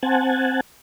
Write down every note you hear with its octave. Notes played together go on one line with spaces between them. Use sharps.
C4 F#5 G#5 A5